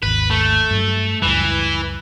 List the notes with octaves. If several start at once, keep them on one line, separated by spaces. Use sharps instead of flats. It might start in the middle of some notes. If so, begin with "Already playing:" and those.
G#1 D#2 B4
A3
G2 F#3
C#2 F#2 E3 G3